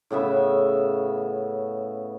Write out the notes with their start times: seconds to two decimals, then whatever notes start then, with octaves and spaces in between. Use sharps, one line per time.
0.11 A2 C#3 B3 E5